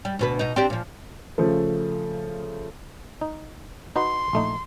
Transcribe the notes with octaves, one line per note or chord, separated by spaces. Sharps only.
G3
D2 B2 B4
B2 D#4
C4 D4 G4
A#2 F3
C#3 F3 A3
D#4
D#4 F#4 B4 C6
A#1 A3 D#4